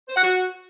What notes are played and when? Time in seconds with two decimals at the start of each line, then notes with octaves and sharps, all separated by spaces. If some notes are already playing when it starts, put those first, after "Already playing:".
0.08 C5
0.16 F#5
0.23 F#4